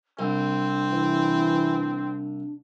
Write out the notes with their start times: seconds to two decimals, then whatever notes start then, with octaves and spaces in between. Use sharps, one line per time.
0.19 C2 C4 D4
0.91 E3